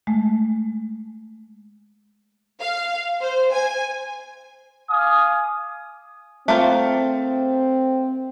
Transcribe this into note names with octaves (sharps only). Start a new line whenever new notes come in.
G#3 A3
F5
C5
G#5
F5 G#5 D6 D#6
A3 A#3 C4 F4